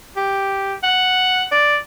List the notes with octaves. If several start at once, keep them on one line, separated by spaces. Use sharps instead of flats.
G4
F#5
D5